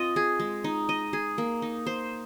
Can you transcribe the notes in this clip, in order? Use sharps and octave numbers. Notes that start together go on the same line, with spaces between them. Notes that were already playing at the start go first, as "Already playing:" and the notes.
Already playing: C4 F4 D#5
G#4
G#3
D#4
D#5
G#4
A#3
D#4
C5